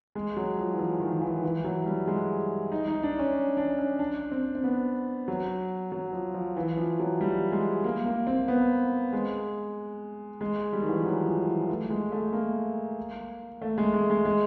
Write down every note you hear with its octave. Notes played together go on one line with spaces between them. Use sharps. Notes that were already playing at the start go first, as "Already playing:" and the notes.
G#3
F#3
F3
E3
F3
D#3
D#3
E3
E3
F#3
G3
G#3
D#4
D#4
D4
C#4
D4
C#4
D4
C4
C4
B3
F#3
F#3
F3
F3
E3
F3
F#3
G3
G#3
A#3
A#3
C4
B3
G#3
G#3
G3
D#3
E3
F3
F#3
F3
E3
A3
G#3
A3
A#3
A3
G#3
G#3
G#3
G#3